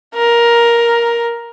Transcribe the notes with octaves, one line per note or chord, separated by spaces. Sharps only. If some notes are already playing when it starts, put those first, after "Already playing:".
A#4